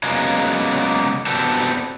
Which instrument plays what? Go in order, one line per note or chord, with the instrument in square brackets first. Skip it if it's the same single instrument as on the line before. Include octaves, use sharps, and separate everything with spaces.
[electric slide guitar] C#3 F#3 G#3 A#3 B3
B3 C4 D4 F#4 G4 A4